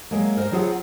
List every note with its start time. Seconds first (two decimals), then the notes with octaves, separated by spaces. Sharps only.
0.11 F#3 G#3 A#3
0.37 A#4 C5 D#5 F5
0.52 F#3 C4 F4 G#4 F5 F#5